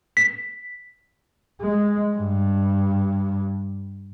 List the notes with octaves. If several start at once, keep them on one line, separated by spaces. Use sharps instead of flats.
B6
G#3
G2